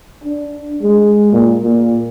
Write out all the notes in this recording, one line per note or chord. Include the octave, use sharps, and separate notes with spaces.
D4
G#3
A#2
A#2